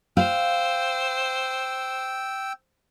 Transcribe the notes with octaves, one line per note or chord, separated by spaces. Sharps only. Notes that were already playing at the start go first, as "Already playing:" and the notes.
C5 F5 G5 E6